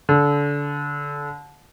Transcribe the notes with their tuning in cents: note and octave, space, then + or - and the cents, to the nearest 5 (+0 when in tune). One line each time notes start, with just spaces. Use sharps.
D3 -25